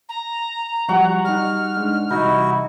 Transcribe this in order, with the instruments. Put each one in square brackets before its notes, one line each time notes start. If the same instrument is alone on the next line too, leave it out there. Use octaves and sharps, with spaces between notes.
[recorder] A#5
[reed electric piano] F3 G3 [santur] F#4 F#5 C#6
[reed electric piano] G3 D#4 [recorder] F6
[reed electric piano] G#3 D4 D#4
[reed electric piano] C3 E3 G3 [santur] D#4 [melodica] E4 F#4